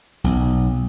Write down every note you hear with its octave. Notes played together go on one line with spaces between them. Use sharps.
B1